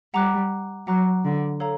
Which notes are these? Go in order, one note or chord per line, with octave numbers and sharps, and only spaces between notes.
G3 F#5 A#5 D6 F#6
F#3 F#5 A#5 D6 F#6
D3
A4 C#5 F5 A#5